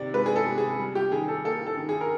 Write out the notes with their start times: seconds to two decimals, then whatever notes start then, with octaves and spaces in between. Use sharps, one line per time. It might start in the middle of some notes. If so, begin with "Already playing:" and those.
Already playing: C3 D#3 D5
0.14 G#3 B4
0.26 G#4
0.36 A4
0.46 C3
0.58 G#4
0.79 G3
0.95 G4
1.12 D#3 G#4
1.28 A4
1.45 A#3 A4
1.67 A4
1.77 D#3
1.89 G#4
2.01 A#4